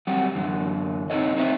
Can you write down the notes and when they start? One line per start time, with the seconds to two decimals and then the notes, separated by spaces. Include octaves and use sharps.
0.07 F#3 G3 C4 F#5
0.35 F#2 D3 E3
1.10 C4 C#4 D#4 A4 C#5 D#5
1.36 C4 D#4 C5 C#5 E5